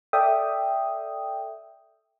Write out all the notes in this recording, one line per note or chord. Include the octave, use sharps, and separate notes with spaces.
A4 D5 E5 G5 D#6